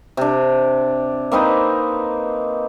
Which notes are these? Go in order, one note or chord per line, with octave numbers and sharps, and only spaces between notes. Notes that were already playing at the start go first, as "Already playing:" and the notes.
C3 D4
A#3 C4 D#4 B4